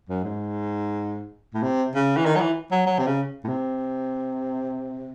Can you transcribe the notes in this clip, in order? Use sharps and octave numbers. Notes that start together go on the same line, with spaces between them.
F#2
G#2
A2
C3
C#3
E3
D#3
F#3
E3
F#3
F#3
C3
C#3
A2
C3